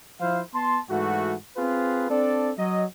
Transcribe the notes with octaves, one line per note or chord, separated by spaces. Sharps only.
F3 E4 C5 F5
B3 A5 C6
G#2 E3 A3 F#4
C4 F4 G#4 B4
C4 D4 A4 D5
F#3 D#5